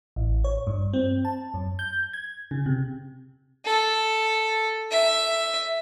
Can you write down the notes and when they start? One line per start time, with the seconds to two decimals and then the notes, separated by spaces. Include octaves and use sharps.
0.16 A1
0.44 C#5
0.67 G2
0.93 C4
1.25 A5
1.54 F#2
1.79 G6
2.13 G#6
2.51 C#3
2.66 C3
3.66 A4
4.91 E5